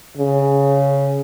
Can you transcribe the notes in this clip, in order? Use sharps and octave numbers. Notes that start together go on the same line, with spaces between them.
C#3